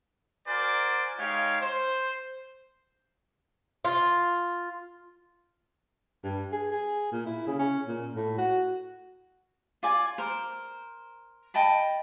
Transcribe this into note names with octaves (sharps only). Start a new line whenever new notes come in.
F#4 A#4 C5 D5 G#5
G#3 D#4 G4 C#5 F5
C5
F4
G2
G#4
G#4
A#2
E4
C#3
C#4
A#2
A2
F#4
F4 D5 G#5
A#4 C5
D#5 G5 A5 B5